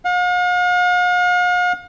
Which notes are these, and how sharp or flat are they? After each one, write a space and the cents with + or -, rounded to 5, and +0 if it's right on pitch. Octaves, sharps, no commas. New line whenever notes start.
F5 +45